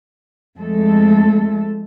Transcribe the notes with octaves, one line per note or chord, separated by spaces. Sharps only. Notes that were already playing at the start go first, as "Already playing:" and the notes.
F2 G#3 A3 A4